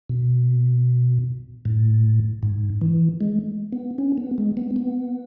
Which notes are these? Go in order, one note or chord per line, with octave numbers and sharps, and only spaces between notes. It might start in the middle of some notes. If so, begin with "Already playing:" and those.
B2
A2
G#2
E3
G#3
B3
C#4
B3
G#3
B3
B3